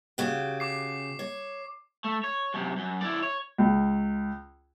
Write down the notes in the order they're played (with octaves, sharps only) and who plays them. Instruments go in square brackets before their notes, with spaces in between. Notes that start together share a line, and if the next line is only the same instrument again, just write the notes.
[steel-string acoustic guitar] C#3 F#4 G4
[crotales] D6 C7
[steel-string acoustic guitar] C#5
[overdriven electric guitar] A3
C#5
F#2 C3
F#2
E4 D5
C#5
[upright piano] C#2